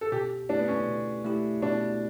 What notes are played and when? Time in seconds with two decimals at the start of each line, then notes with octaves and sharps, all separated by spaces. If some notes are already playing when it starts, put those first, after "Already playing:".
0.01 A4
0.12 B2 G4
0.49 A3 D4 E4 G4
0.59 B3
0.68 C#4
0.87 B2
1.25 A3 E4 G4
1.62 B2 D4